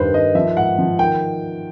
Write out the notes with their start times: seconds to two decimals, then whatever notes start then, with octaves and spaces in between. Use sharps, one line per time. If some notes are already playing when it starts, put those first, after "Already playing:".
Already playing: G2 D#3 B4 C5
0.14 D#3 D#5
0.35 F3 E5
0.56 G#2 F#5
0.79 F3
0.99 D#3 G5